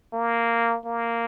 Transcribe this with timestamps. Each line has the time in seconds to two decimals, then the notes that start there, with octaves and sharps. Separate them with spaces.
0.13 A#3
0.86 A#3